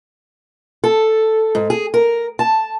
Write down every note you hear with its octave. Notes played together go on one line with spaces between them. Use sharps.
A4
G#2
G#4
A#4
A5